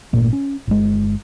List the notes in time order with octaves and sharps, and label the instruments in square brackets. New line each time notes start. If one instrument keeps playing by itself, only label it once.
[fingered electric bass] G1 A#2 A3 A#3
C#4
G1 G#3